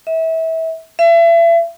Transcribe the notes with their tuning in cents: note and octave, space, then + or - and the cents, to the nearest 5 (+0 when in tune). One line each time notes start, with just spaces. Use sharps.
E5 -25
E5 +35